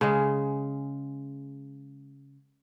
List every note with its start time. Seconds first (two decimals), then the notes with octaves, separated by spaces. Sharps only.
0.01 C#3 G#3